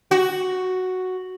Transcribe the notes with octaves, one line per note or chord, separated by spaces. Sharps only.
F#4